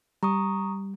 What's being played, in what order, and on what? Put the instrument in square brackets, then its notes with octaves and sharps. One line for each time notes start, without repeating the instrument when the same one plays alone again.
[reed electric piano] G3 [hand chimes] A#5 C#6 D#6